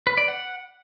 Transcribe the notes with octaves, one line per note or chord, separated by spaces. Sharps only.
B4
D5
F#5